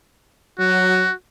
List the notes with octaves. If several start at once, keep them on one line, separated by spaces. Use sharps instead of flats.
F#3 F#4